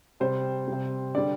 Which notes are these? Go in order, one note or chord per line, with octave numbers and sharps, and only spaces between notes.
C3 G3 C5
C3 G3
D3 G3 D5